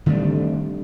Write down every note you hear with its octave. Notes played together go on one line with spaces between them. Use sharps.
D3 D#3 G3 A3 C4